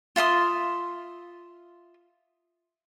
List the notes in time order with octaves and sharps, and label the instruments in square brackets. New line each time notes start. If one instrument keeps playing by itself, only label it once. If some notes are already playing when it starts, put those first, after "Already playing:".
[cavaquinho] F4 E5 C6 D#6